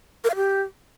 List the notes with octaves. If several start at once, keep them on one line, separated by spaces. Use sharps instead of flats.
A#4
F5
G4